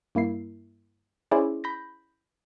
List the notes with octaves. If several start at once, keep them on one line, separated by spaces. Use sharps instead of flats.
G2 A#3 E4 C7
C#4 E4 G#4 C5 D5
B5 G6 A#6